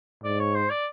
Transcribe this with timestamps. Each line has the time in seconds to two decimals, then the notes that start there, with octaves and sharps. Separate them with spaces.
0.24 G#2 D5
0.39 C#5
0.55 C5
0.70 D5